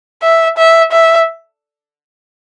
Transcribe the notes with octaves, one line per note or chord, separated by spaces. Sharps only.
E5
E5
E5